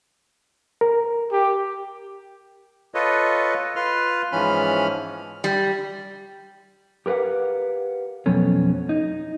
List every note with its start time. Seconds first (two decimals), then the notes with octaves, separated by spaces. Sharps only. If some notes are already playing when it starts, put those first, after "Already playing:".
0.81 A#4
1.32 G4
2.94 F4 A4 B4 C#5 D#5
3.76 F4 B4 C6 F6
4.32 G#2 E3 F3 C#4 B5 F6
5.44 G3
7.06 G4 A#4 B4 F5 F#5
8.26 F2 B2 F#3 A3 C#4
8.89 D#4